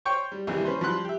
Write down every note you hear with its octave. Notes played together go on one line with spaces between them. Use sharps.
C5 C#5 G5 C#6
G3
A#1 D#2 C3 E3 G3
C#4 B4 C5
F3 G3 B5 C6 F#6
G4 E5